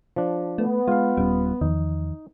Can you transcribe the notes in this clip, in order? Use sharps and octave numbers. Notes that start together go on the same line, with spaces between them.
F3 D4
A3 B3
G#3 F4 F5
D#1 G3 C#4
E2 D#3 F3 D#4